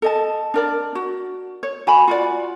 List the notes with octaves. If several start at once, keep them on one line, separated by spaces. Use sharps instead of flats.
A4 D#5 A5
D4 A#4 D5
F#4
C#5
F#4 G#5 B5
F4 F#4 D5